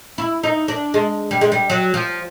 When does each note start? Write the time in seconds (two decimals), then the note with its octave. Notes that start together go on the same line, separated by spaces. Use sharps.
0.18 E4
0.43 D#4
0.68 D4
0.94 G#3
1.31 G3
1.41 G#3
1.52 G3
1.70 F#3
1.94 F3